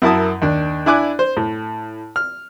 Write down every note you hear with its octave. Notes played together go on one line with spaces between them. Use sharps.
F#2 E4 A#4 A5 D#6
D#2 D4
D4 E4 G#5 D6 F#6
C5
A2
F6